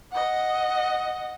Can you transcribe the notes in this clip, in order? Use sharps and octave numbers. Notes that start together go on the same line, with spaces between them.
D#5 F#5